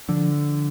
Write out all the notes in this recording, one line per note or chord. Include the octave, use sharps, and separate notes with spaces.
D3 F3